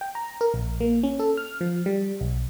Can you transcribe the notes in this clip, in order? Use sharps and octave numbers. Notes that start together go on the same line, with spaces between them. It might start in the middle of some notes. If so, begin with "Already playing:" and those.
G5
A#5
A#4
A#1
A#3
C#4
A4
F6
F3
G3
B1